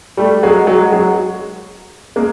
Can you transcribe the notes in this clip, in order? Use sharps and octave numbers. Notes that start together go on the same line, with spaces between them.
G3 A3
F#3 G#3
F#3 G#3
F#3 G#3
G#3 A#3